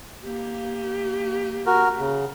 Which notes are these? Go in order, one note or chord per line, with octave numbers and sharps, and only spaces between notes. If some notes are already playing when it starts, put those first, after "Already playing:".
A#3 G4
F#4 A#4
C#3